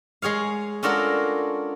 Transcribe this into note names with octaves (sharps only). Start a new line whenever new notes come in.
G#3 G#4 C#5 F5
C#4 D4 F4 F#4 A4 A#4